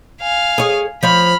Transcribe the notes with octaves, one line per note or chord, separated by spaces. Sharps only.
F5 G#5
G#4 C#5
F3 C#5 B5 F6